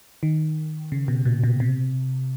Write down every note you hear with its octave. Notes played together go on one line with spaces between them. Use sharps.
D#3
C#3
B2
A#2
B2
C3